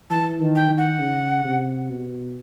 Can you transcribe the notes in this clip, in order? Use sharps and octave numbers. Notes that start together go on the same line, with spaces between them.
E3 A5
D#3
G5
D#3
F#5
C#3
C3
B2